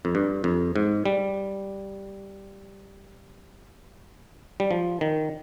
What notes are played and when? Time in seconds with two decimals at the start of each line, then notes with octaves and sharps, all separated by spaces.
0.05 F2
0.15 G2
0.44 F2
0.76 G#2
1.06 G3
4.60 G3
4.71 F3
5.01 D#3